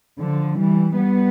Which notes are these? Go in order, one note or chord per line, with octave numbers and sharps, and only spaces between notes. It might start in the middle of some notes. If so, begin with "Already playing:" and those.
D3 F3
E3 G3
G3 B3